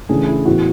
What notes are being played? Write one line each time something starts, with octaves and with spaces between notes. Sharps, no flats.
C#3 E3 A3 D4 G#4
E4
A2 E3 B3 F#4